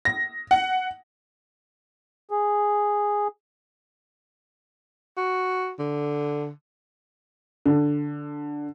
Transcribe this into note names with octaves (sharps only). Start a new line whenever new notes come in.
A#6
F#5
G#4
F#4
D3
D3